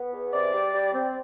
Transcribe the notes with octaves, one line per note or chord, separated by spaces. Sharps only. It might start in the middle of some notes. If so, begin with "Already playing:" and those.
Already playing: B3
E2
C3 D5
G3
G3
C4